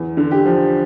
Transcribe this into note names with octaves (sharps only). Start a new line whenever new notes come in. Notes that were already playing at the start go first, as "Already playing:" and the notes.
Already playing: E2
D3
G4
F3